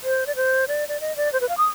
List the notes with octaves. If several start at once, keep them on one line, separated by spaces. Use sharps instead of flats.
C5
D5
C5
D5
D5
D#5
D5
C5
B4
F5
D#6